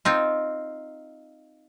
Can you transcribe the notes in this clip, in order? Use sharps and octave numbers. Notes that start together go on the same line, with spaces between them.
C4 D#4 F4